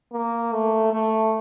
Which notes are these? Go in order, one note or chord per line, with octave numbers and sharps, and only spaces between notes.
A#3
A3
A3